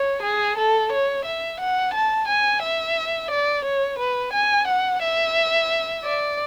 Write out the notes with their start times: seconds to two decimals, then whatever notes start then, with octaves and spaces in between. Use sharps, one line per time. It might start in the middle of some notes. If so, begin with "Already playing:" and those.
Already playing: C#5
0.23 G#4
0.57 A4
0.92 C#5
1.25 E5
1.60 F#5
1.94 A5
2.28 G#5
2.63 E5
3.31 D5
3.65 C#5
3.99 B4
4.33 G#5
4.67 F#5
5.02 E5
6.05 D5